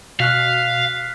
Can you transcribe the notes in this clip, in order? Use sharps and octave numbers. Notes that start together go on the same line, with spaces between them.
B2 F5 F6 F#6 B6